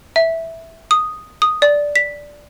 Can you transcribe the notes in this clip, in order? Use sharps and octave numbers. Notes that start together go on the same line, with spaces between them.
E5
D#6
D#6
D5
B6